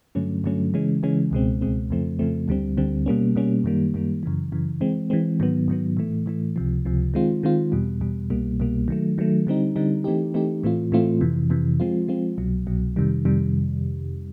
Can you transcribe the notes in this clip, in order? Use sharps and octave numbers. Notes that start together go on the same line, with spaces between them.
G2 D3 F#3 A3 C#4
G2 D3 F#3 A3 C#4
C#3 E3 G#3 C#4
C#3 E3 G#3 C#4
C#2 B2 G#3 C4
C#2 B2 G#3 C4
F2 C#3 F3 A3 C4
F2 C#3 F3 A3 C4
D2 D3 G3 C4
D2 D3 G3 C4
B2 G3 A#3 C#4
B2 G3 A#3 C#4
F#2 D#3 G3 A#3
F#2 D#3 G3 A#3
F#2 C#3 E3
F#2 C#3 E3
E3 G#3 C4
E3 G#3 C4
G#2 D#3 F#3 B3
G#2 D#3 F#3 B3
A2 E3 A3
A2 E3 A3
C#2 C3 F3
C#2 C3 F3
D#3 G#3 C4 F4
D#3 G#3 C4 F4
E2 B2 G3
E2 B2 G3
C2 B2 G3 A#3
C2 B2 G3 A#3
D#3 F#3 A3
D#3 F#3 A3
D3 G3 C4 D#4
D3 G3 C4 D#4
E3 A3 C4 D#4 G4
E3 A3 C4 D#4 G4
A2 E3 A3 C4 F4
A2 E3 A3 C4 F4
F2 C3 E3
F2 C3 E3
F3 G#3 C4 F4
F3 G#3 C4 F4
C2 B2 F#3
C2 B2 F#3
F2 C3 D#3 G3
F2 C3 D#3 G3